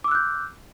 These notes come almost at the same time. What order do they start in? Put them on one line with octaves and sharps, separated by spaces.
D6 E6 F#6 G6